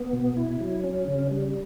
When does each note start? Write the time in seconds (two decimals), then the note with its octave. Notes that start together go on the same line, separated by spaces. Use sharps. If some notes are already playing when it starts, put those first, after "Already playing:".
Already playing: B3
0.13 B2
0.37 E4
0.60 F#3
0.84 C#4
1.07 C#3
1.31 G3